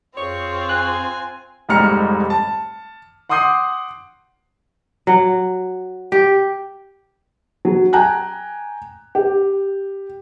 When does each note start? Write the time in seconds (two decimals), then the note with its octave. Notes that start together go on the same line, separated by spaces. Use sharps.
0.17 F2 C4 F4 G#4 C#5 C#6
0.69 G#5 F#6
1.69 F1 G#2 G3 A#5 F6 C#7
2.30 A5
3.29 F#5 C6 D6 D#6 G6 C7
5.07 F#3
6.12 G4
7.65 F#3
7.93 G5 G#5 A#5 F#6
9.15 G4